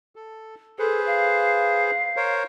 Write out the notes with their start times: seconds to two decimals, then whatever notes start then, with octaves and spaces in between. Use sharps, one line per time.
0.16 A4
0.79 G#4 A4 B4 C5
1.06 F5
2.16 A#4 C5 C#5